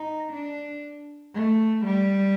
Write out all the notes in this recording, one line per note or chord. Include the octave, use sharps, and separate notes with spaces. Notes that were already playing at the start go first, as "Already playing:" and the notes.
Already playing: D#4
D4
A3
G3